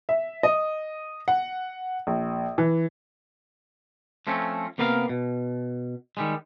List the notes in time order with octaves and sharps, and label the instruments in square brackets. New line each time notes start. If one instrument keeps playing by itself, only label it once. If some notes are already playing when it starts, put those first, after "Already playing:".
[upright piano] E5
D#5
F#5
A#1
E3
[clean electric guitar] F3 A3 C4 C#4
C3 A#3 B3 A#4 D5 F5
B2
D#3 G3 G#3